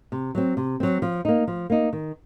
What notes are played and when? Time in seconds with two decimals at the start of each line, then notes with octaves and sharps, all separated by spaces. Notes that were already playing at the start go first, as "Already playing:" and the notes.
0.12 C3
0.35 F#3 C4
0.57 C3
0.80 F#3 C4
1.02 F3
1.25 A#3 D#4
1.48 F3
1.70 A#3 D#4
1.93 D#3